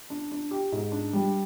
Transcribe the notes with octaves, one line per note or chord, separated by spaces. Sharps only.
D4
D4
G4
G#2
D4
G3